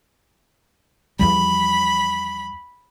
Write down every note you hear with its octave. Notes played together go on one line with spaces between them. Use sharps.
E2 F3 G3 B5